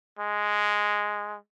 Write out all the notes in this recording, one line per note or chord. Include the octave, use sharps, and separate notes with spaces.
G#3